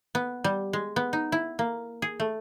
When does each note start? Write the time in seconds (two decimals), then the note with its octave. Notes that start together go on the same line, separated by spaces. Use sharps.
0.15 B3
0.44 G3
0.73 G#3
0.96 B3
1.13 D#4
1.32 E4
1.59 A#3
2.02 G#4
2.20 A3